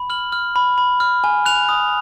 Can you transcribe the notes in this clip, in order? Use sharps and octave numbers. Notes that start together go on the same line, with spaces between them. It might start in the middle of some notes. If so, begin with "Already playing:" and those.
Already playing: B5
F6 F#7
F6
B5
B5
F6
G#5
F#6 F7
D#6